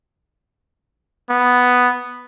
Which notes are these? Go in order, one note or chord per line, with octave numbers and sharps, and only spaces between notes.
B3